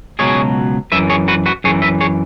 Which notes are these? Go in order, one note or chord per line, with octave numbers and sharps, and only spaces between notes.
C#2 B2 F#3 G#4 C#5
F#2 E3 B4 E5
G#4 C#5
F#4 B4
F#4 B4
F#2 E3 G#4 C#5
B4 E5
G#4 C#5